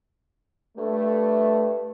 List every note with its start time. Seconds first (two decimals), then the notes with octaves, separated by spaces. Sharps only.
0.78 G2 A3